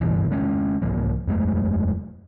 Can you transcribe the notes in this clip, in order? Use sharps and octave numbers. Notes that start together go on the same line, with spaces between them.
F#1 G2 B2 E3
D#3 G#3 B3 C#4
C2 G#2 F3 A#3
E1 F#2 G#3 A3